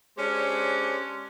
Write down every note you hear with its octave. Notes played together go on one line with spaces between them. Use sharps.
G#3 C#4 D4 G4 C5 C#5